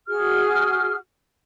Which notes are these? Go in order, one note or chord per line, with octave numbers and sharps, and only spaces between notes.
F#4 G#4 F6